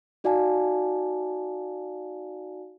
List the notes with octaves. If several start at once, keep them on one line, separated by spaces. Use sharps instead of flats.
D#4 F#4 D5 F5 G#5 A5